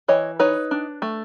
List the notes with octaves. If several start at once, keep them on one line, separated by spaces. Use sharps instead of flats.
E3 C#5 D#5
D#4 B4 C#5
D4
A3